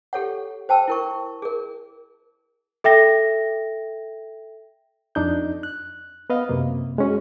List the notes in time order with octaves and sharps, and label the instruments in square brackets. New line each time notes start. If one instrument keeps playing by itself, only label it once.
[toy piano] G4 A4 C#5 F#5
C5 G5 A5 E6
E4 A#4 C#6
G#4 A#4
[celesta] A4 E5 G5 A#6
[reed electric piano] F2 D4 D#4 G6
F#6
B3 B4 D#5 F5
F#2 C3 A#3
G#3 C#4 F#4